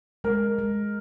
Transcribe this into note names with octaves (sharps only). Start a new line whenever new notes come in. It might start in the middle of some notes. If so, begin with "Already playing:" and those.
G#3 A#4
G#3